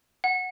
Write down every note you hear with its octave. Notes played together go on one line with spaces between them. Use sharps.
F#5